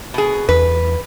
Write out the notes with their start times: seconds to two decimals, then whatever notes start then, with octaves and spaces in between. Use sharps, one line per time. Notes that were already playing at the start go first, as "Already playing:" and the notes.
0.14 B2 G#4
0.49 E2 B4